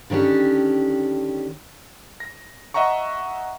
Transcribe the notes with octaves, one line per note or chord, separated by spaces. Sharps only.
D3 D#3 C#4 D4 G4
A#6
D#5 E5 F#5 A#5 C#6